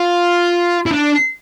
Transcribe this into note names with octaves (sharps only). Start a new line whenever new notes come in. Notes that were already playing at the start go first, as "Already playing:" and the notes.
Already playing: F4
E4
D4